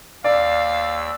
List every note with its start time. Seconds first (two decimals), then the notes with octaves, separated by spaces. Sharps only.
0.24 D#2 D5 F5 E6